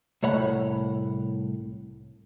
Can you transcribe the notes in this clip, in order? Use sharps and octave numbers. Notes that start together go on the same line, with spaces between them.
C2 A2 C#5 F#5 B5